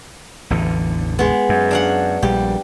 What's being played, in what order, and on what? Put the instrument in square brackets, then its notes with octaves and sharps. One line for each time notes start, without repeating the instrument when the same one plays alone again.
[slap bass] A1 E2 D3
[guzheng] G#3 B3
[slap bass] F#2
[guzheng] D4 F5 F#5
[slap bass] A#1 G3 [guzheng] G4